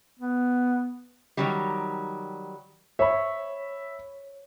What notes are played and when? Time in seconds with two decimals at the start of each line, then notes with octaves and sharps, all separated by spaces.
0.19 B3
1.37 D#3 F#3 G3
2.99 C#5 E5 B5